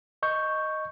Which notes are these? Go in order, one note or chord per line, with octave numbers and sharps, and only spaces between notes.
D#5 C#6 G6